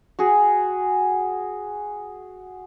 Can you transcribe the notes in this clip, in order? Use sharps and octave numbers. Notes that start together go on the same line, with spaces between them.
F#4 G#4